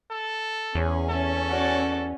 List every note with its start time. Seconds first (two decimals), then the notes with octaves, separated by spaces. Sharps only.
0.11 A4
0.75 E2 C#4 G#4
1.10 C#4 A4
1.49 F#4 D5